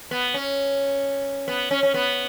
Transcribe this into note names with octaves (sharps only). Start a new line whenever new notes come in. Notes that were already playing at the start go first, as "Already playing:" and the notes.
B3
C#4
B3
C#4
C#4
B3